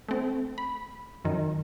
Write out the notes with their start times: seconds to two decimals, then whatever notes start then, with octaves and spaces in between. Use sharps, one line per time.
0.09 A3 C4
0.58 B5
1.25 F#2 D#3